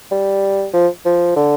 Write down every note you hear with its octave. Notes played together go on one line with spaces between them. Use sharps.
G3
F3
F3
D3